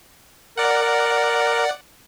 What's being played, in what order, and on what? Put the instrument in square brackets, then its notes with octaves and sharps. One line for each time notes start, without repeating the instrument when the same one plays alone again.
[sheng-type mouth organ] A#4 [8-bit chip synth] D5 F#5
[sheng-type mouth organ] A#4